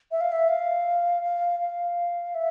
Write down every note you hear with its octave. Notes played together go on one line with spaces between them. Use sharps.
E5
F5
E5
F5
F5
F5
E5